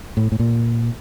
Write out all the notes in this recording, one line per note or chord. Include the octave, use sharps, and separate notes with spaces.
A2
A2
A#2